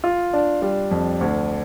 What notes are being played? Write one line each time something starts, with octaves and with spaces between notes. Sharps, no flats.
F4
D4
G3
F2
D2